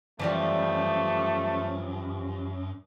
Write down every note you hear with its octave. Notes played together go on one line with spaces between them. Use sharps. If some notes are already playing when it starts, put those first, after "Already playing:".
F#2 E3 F3 G3 A3